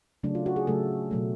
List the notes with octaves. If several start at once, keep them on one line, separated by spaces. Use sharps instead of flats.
C#3 F#3 A3 D4
F4
F#4
G#4
C#3 F#3 A3 A4
B2 F#3 A3